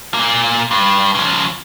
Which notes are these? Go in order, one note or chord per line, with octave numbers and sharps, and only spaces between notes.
A#2 A#3
G2
C#3 F3